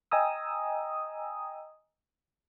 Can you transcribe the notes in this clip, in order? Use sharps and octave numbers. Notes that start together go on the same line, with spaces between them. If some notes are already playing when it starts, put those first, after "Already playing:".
D#5 G5 G#5 A#5 D#6 E6